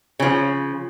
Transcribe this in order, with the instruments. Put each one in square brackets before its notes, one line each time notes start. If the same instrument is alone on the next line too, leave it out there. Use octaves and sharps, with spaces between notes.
[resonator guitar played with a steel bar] C#3 F3